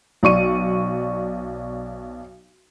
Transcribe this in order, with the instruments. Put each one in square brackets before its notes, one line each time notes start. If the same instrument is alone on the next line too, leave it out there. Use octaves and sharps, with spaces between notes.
[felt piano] B1 D5 C#6 D#7